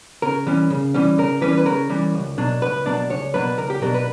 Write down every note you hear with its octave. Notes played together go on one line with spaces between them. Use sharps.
C#3 A#4
E3 G3 C#4
C#3
E3 G3 C#4
C#3 A#4
E3 G3 C#4 B4
B4
C#3 A#4
E3 G3 C#4
C#2
B2 F#3 A#3 D4
C#2 B4
B2 F#3 A#3 D4 D5
C#2 C#5
B2 F#3 A#3 D4 B4
C#2 A#4
G4
B2 F#3 A#3 D4 A#4
B4